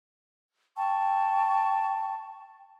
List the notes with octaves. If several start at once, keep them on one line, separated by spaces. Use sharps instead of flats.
G5 A5 C#6